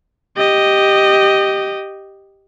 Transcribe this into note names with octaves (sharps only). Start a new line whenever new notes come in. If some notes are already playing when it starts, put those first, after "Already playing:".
G4 D#5